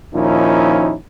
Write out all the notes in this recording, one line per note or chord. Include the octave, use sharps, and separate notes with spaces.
D#2 A#2 F3 C#4 D#4 E4